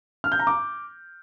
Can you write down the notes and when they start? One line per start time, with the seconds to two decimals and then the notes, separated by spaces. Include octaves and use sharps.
0.24 F6
0.32 G6
0.39 A#5
0.47 D6